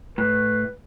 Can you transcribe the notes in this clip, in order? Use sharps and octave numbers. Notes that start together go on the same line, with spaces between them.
A2 B4